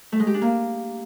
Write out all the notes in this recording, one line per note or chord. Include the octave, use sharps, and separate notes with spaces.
A3
G#3
G4
D4
A#3